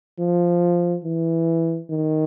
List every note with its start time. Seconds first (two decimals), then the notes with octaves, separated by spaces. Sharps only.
0.19 F3
1.04 E3
1.90 D#3